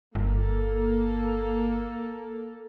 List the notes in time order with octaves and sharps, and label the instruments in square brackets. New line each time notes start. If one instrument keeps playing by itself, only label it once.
[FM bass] G1 [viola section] A#3 A4